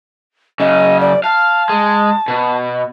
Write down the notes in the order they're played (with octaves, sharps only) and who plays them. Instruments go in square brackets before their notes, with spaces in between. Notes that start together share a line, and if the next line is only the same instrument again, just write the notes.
[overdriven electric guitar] F#2 C#3 [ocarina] D#5
[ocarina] D5
[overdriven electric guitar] F5 [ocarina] A5
[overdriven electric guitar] G#3
B2